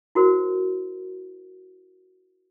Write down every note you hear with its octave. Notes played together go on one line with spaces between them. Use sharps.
E4 F#4 A#4 C5